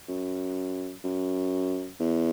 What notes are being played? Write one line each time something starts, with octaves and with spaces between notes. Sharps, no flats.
F#2
F#2
E2